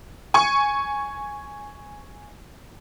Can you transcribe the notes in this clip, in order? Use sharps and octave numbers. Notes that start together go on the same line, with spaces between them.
G#5 C#6